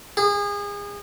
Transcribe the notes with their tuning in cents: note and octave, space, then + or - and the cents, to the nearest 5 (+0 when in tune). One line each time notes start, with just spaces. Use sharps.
G#4 -30